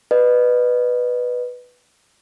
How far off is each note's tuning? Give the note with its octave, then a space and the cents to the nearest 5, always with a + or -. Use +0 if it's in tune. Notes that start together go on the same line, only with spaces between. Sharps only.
B4 +0 D#5 -35